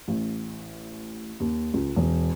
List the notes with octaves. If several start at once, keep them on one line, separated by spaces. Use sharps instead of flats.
A1
D#2
C#2
E1